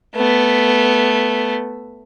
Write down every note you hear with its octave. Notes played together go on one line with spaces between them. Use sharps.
A3 B3